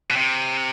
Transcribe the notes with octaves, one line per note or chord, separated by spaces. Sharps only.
B2
C3